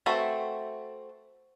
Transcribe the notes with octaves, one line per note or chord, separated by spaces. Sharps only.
A3 C4 F#4 A4 B4